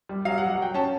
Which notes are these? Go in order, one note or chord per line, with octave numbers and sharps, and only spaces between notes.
G3
F#3 F5
F#5
F#3
F#5
F#3 G5
C#4 A5